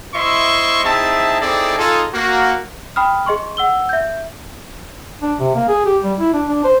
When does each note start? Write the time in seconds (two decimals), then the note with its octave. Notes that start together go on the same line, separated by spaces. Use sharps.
0.14 E4 C5 D#5 E5 C6 C#6
0.85 C4 D#4 E4 G#4 E5 A5
1.41 C4 D#4 E4 G#4 A4 D5
1.77 D#4 F4 G#4 A4
2.14 A#3 F#4
2.96 G5 B5 D#6 F6
3.26 G#4 D#5 C6 C#6
3.57 F#5 E6 G7
3.89 E5 G6
5.22 D4
5.39 C3
5.56 A#3
5.68 G#4
5.86 G4
6.04 G3
6.19 E4
6.34 D4
6.47 D4
6.64 C5